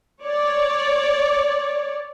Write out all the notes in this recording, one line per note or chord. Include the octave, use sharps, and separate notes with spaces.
C#5 D5